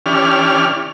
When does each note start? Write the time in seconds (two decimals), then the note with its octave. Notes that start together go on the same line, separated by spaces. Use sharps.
0.06 E3 C#4 D4 G4 F6